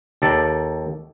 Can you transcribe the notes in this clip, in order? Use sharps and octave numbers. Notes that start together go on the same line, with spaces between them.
D#2 A4 D5